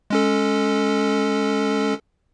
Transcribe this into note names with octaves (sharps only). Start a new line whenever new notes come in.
G#3 C#4 A4